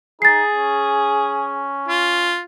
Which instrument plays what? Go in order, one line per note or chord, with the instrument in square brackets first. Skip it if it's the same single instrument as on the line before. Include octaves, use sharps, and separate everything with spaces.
[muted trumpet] D#4 [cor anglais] G#4 [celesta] A6 C7
[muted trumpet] C#4
[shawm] F4